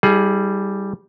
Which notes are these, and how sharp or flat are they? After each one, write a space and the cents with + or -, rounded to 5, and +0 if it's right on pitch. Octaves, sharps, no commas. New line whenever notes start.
G3 +0 E4 -35 G#4 +20